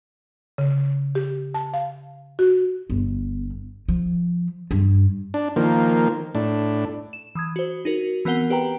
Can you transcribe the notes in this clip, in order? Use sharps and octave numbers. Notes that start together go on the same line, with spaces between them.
C#3
G4
A5
F5
F#4
G1
F3
G2
D4
D#3 F3 A#3
A2 D4
E7
E3 D#6 G#6
F#4 C5
D#4 F#4 A#4
E3 B3 C4 A#4 F#5 G7
G4 B4 G5 A#5